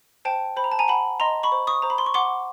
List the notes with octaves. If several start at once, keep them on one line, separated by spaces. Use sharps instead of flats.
C5 G5 A5
C5 B5
A#5
A5
G#5 A#5
F#5 A5 B5
D#5 A#5 C6
B5 C#6
C5
C#6 D#6
C5 A#5
B5
C6
C#6
F#5 C6 D6